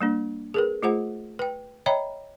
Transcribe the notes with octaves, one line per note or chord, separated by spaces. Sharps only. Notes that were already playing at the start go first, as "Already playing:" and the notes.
G3 A#3 D4
G#4 A#4 B4
A3 F4 G#4 C5 F#5
B4 G5
C#5 D#5 E5 G5 A#5 B5